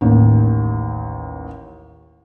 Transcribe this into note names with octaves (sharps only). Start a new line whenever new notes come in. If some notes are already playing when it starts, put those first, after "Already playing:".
A1 D#2